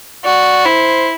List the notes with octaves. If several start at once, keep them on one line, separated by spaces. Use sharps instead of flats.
F#4 D5
E4 C5